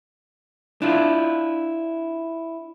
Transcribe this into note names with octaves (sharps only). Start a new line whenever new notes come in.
D4 E4 F4